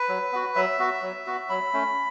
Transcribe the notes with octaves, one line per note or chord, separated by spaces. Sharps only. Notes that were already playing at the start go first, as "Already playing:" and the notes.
Already playing: B4
F#3
B3 F#4
F#3 E5
B3 F#4
F#3
B3 F#4
F#3 B5
A3 C#4